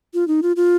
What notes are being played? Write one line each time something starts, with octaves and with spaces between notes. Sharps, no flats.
F4
D#4
F4
F4